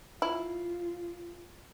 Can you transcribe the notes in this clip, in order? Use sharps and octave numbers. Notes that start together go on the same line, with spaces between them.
E4 F4